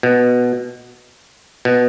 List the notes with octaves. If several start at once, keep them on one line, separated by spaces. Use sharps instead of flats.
B2
B2